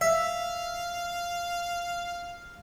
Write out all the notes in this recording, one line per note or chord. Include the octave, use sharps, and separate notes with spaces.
E5 F5